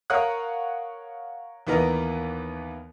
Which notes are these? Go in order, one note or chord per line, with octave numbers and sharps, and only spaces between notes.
A#4 C#5 F5 F#5 D#6 F#6
D#2 E3 B3 A#4 D#5